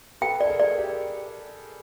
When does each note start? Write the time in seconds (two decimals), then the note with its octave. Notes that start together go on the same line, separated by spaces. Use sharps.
0.21 A4 B4 G5
0.41 A4 D5
0.50 G#4 A#4
0.59 D5
0.78 G4